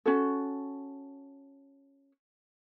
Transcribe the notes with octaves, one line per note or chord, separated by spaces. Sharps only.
C#4 F#4 A4